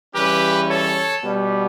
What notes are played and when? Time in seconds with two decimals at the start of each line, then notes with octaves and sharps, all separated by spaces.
0.15 C#3 E3 G3 C#4 G4 B4
0.69 A4 C#5
1.23 B2 G3 B3